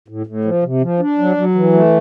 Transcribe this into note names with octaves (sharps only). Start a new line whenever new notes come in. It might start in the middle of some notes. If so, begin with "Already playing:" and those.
A2
A2
F3
C3
F3
D4
F#3
F#3
E3
A3